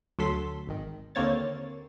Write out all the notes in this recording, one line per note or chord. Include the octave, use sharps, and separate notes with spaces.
D2 F#3 A4 C6 B6
G#1 D#3
D#2 D3 A#3 C4 C#5 A6